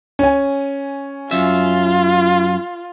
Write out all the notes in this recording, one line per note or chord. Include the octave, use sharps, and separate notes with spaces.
C#4 G#5
F#2 F4 E5